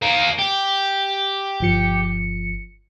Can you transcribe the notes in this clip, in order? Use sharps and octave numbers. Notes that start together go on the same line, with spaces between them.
A#3 D#4
G4
G1 F3 C#7